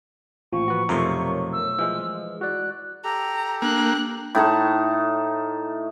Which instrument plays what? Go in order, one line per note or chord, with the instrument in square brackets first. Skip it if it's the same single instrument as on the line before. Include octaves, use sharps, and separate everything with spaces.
[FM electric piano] A1 A#2 F3 [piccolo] C#6
[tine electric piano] F#4 B4
[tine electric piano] B1 A3 C6 [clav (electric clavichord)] F2 C3 [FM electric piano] A#4 C#5
[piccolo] E6
[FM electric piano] E3 G#3 [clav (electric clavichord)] F3
[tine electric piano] F#4 D5 [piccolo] F#6
[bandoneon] G4 A4 [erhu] A#5
[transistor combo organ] A#3 [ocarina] D4 [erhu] F#6
[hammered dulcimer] A2 D#4 A5 C#6